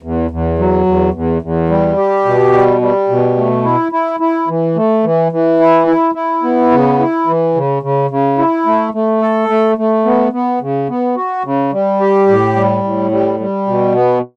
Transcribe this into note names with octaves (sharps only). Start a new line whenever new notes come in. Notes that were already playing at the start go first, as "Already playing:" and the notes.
E2
E2
F#3
E2
E2
E2
G3
G4
B2
G3
G3
B2
A3
E4
E4
E4
E3
A3
E3
E3
E4
E4
E4
B3
C#3
E4
E3
C#3
C#3
C#3
E4
A3
A3
A4
A3
A3
B3
B3
C#3
B3
F#4
C#3
G3
G4
A2
G3
A2
G3
G3
B2
B3